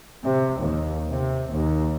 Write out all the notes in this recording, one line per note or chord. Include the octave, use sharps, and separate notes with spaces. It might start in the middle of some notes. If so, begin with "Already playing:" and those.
C3
D#2
C3
D#2